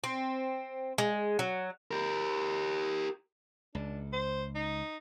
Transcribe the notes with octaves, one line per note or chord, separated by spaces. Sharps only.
C4
G#3
F#3
G4 A#4
C#2 D4
C5
D#4